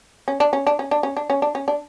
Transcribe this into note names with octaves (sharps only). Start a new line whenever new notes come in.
C#4
D4
C#4
D4
C#4
D4
C#4
D4
C#4
D4
C#4
D4